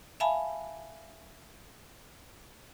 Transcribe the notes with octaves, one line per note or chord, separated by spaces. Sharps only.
E5 F5 G#5 A5 B5